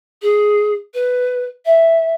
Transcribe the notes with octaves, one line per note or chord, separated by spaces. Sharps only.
G#4
B4
E5